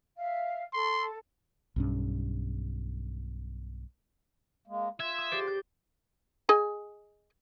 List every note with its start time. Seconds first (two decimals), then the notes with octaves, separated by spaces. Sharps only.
0.18 E5 F5
0.73 A4 C6
1.76 B1 G2 C#4
4.67 G#3 A#3
5.00 F4 E5 G#6
5.18 D#6
5.31 G4 C5 D5
5.47 G6
6.49 G#4 D#5 G#5